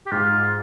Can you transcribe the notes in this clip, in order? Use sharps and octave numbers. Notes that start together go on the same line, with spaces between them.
G4
G#2 F4